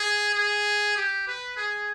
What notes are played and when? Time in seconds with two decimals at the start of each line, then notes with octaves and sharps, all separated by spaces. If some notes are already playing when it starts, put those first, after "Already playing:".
Already playing: G#4
0.35 G#4
0.96 G4
1.27 B4
1.57 G#4